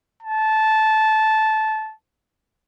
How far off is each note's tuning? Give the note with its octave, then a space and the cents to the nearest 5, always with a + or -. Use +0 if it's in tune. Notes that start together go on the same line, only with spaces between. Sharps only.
A5 -15